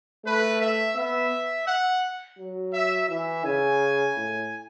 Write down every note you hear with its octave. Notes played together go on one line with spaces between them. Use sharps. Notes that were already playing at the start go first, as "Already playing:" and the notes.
A3 B4
E5
B3 E5
F#5
F#3
E5
E3 E5
C#3 G#5
A2